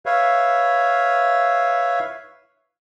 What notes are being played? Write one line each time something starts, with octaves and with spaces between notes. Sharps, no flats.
B4 C#5 E5 F5